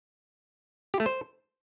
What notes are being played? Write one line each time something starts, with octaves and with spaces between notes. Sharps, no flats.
G4
A3
C5